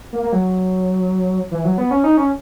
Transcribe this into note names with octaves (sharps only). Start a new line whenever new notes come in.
A#3
A#3
F#3
E3
F#3
B3
C#4
D#4
C#4